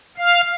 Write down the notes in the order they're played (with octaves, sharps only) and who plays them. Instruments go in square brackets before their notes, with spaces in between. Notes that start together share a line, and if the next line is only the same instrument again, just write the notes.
[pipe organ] F5